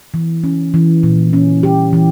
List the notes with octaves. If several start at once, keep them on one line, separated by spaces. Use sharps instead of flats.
E3
C#4
E3
A#2
C#4
G4
E3